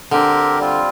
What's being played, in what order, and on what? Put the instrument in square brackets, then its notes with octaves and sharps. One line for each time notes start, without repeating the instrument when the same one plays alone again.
[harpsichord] D3 [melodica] C4 G4 A#4
[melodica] G3 C4 F4